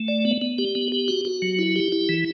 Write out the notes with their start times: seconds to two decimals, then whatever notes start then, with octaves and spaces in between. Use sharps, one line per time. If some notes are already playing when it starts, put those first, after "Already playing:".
Already playing: A3
0.08 D5
0.25 B3
0.41 B3
0.58 G4
0.75 B3
0.92 G4
1.08 F#4
1.25 F#4
1.42 F#3
1.59 E4
1.76 G4
1.92 E4
2.09 E3